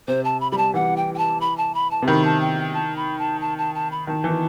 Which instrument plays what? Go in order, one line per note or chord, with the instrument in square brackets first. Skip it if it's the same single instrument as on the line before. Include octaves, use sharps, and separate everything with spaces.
[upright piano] C3 [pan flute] C5
[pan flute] A5
B5
[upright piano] G3 [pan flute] B5
[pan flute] A5
[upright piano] E3 [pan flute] F#5
[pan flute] G5
G5
A5
B5
A5
B5
A5
[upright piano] C3
[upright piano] D#3 [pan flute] B5
[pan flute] A5
G5
G5
A5
B5
A5
A5
A5
A5
B5
[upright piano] D#3 [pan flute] A5
[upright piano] E3